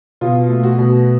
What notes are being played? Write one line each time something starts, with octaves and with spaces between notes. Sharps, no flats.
B2 F4
A3
F#4
B2